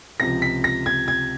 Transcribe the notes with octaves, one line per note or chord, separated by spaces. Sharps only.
C#2 C3 F3 A#6
B6
A#6
G#6
G#6